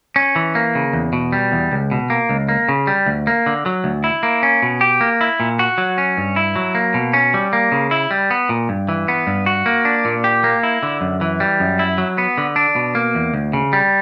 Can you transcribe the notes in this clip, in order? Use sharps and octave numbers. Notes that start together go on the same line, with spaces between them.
C#4
E3
A#3
C#3
E2
B2
G3
E2
C#2
B2
A#3
C#2
A#3
C#3
G3
D2
A#3
D3
F#3
D2
E4
A#3
C#4
B2
G4
A#3
E4
A#2
F#4
F#3
C#4
G2
E4
F#3
A#3
B2
C#4
G3
A#3
C#3
E4
G3
B3
A#2
G2
E3
B3
G2
F#4
A#3
D4
A#2
G4
A#3
E4
D3
F#2
E3
G3
F#2
E4
F#3
B3
D3
D4
B2
A#3
E2
D2
C#3
G3